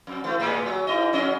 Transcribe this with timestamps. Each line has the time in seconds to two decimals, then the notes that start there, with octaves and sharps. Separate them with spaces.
0.07 F2
0.24 E3 A3
0.40 A2 G#3 B3
0.65 F#3
0.87 G#2 E4 D#5
1.13 F2 C#4 D#5